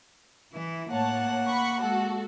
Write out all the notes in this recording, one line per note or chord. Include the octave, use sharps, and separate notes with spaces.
E3 E4
A2 A#3 C#5 F#5 A5
B5 C#6
G#3 F#4 A4